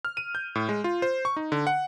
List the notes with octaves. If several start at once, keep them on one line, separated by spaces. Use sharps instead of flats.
F6
D#7
G6
A2
G#3
F4
C5
C#6
D#4
D3
F#5